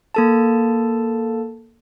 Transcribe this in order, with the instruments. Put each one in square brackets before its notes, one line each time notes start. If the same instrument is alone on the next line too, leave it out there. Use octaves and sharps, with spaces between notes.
[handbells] A#3 A4 A5